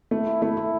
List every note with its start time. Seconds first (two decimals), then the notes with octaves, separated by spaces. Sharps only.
0.11 A3 E4
0.27 E4
0.42 A3 E4
0.57 E4